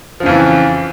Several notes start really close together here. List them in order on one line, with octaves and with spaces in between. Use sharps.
F3 C#3 F2 E3